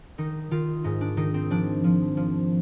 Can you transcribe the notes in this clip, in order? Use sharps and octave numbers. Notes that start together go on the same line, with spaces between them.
D#3 D#4
D#3 F4
G#2 D#4
D4
D#3 D#4
C4
F3 D4
F3
F3